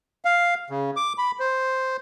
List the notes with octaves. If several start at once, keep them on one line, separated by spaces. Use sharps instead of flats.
F5
C#3
D6
B5
C5